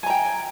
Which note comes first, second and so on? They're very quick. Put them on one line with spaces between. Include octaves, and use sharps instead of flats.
G#5 A#5 G5